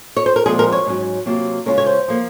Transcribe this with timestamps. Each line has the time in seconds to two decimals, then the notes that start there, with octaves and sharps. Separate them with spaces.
0.17 C#5
0.26 C5
0.36 A#4
0.45 A#2 F3 G#3 C4 F4 G#4
0.59 A#4
0.72 C#5
0.86 G#2 F#3 C#4
1.26 C3 F#3 A#3 F4
1.66 C#3 G#3 C#4 F4 A#4
1.78 C#5
1.86 C5
2.08 F3 A#3